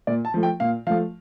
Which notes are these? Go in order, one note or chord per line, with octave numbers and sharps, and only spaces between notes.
A#2 D5
A5
F3 A3
G5
A#2 F5
F3 A3 F5